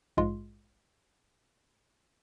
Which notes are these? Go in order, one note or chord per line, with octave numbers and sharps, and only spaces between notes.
A#1 G#2 G#3 F4 C6